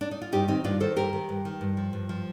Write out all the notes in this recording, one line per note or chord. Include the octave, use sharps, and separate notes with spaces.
D4
D#4
F4
G2 D#4 G4
D#3 C4 D#4
G2 D4 F4
D#3 A4 C5
G2 G4 A#4
D#3
G2
D#3
G2
F3
G2
F3